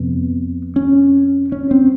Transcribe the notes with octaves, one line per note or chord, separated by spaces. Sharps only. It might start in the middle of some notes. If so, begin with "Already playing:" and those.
Already playing: F2 C3 B3
C#4
C#4
C4